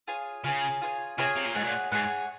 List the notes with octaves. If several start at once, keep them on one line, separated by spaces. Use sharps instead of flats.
F4 G#4 C#5 G#5
C#3 F4 G#4 C#5 G#5
F4 G#4 C#5 G#5
C3 F4 G#4 C#5 G#5
C3
A#2
G#2 G#4 C#5 F#5
A#2
G#2 G#4 C#5 F#5